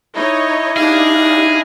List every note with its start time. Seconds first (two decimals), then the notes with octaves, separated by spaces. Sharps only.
0.15 D#4 E4 C#5 D#5
0.77 D4 D#4 G4 G#4 F5